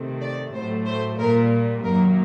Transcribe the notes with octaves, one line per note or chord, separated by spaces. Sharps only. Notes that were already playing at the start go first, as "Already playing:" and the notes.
Already playing: C3 D#3 A3
D5
A2 F#3 A3 C5
C5
A#2 G3 A#3 A#4
F#2 D#3 F#3 A#3 A#4